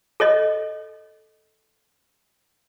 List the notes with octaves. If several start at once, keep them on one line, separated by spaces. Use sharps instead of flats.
A4 C#5 D#5